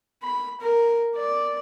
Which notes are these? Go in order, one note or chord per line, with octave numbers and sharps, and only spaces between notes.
B5
A#4
D5